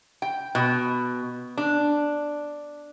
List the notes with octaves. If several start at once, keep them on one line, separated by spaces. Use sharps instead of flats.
G5
B2
D4